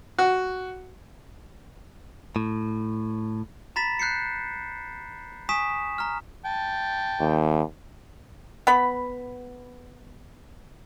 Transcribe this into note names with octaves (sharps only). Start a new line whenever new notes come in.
F#4
A2
A#5 B5 A6 B6 E7
F#6 G6 C7 C#7
G#5 C#6 D#6 B6 E7
A#5 F6
G5 A5
D#2
B3 B5